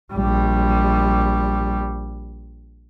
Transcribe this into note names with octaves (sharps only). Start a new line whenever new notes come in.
A#1 G3